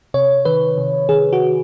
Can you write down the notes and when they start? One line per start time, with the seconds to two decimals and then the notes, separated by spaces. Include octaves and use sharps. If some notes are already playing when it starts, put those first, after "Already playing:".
0.14 C3 C#5
0.45 D#3 B4
0.78 C3
1.09 D#3 G#4
1.33 F#4